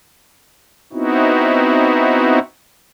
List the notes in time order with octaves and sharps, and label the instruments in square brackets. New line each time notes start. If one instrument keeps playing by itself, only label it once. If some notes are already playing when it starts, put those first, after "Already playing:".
[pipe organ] B3 C4 D#4 E4 F#4